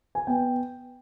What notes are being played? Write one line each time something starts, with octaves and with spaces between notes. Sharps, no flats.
G#5
B3 G5